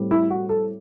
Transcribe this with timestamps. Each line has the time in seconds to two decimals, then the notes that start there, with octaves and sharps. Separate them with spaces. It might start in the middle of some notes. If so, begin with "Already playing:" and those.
Already playing: A2 G3 C4
0.11 E4
0.30 F#4
0.49 A4